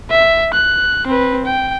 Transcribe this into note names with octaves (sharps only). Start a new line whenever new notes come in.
E5
F#6
C4 B4
G5